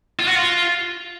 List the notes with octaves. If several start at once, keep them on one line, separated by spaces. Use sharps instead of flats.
F4
F#4
F4